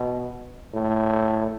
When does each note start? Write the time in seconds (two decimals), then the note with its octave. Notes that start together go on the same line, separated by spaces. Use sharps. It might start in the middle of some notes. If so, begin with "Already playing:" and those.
Already playing: B2
0.74 A2